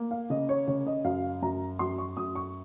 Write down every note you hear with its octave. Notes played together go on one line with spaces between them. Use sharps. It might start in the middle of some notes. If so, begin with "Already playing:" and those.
Already playing: A#3
F5
C#3 D#5
C#5
C#3 C#5
D#5
F#2 F5
F#2 A#5
F#2 C6
C#6
F#2 D#6
C#6